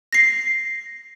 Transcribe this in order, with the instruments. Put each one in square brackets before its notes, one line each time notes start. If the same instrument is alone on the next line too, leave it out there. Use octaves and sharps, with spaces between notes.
[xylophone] A#6 C7